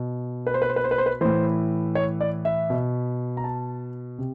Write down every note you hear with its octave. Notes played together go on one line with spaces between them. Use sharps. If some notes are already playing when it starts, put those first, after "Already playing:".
Already playing: B2
B4
C5
B4
C5
B4
C5
B4
C5
B4
A2 E3 C5
C#5
D5
E5
B2
A#5
A5
C3